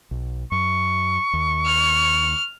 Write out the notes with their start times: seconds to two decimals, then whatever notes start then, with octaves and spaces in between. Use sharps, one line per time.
0.11 B1
0.52 F#2 C#6
1.33 D#2
1.66 F6